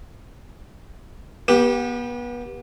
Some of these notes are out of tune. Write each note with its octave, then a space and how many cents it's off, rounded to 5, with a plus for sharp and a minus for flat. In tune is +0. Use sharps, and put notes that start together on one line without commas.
B3 -30 G4 +5